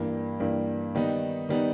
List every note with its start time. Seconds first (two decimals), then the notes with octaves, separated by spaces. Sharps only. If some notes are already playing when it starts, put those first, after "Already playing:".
Already playing: G2 E3 G3 A#3
0.40 G2 E3 G3 A#3
0.95 D#3 G3 B3 D#4
1.49 D#3 G3 B3 D#4